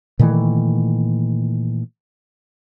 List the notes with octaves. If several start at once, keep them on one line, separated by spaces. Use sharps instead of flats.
A#2 D#3 E3 A3